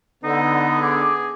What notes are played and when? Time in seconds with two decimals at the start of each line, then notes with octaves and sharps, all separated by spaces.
0.24 D3 B3 D#4
0.82 G#4 D6